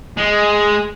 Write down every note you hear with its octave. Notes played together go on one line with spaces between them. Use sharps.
G#3